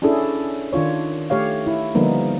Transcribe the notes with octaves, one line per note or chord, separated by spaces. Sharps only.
C#4 D4 E4 G#4 A4
D#3 D4 F4 C#5
A3 G4 C#5 F5
E4
D3 F3 G3 A#3 B3 D#4